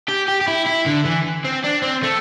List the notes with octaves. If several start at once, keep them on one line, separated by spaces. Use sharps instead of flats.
G4
G4
G4
E4
E4
D3
E3
C4
D4
C4
A3